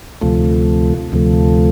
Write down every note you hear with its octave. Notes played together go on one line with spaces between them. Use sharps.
D2 C3 F3 A3
D2 C3 F3 A3